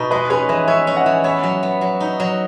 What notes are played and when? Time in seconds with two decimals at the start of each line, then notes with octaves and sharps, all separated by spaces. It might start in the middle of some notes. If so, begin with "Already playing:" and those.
Already playing: B2 D#4 A#4
0.11 G#3 B4 D#5
0.30 C#4 G#4 B4
0.49 E3 B4 D#5
0.68 C#4 C#5 E5
0.87 C#4
0.97 D#5 F#5
1.06 E3
1.24 B3 C#5 E5
1.43 F#3
1.63 B3
1.81 F#3
2.00 D#4
2.20 F#3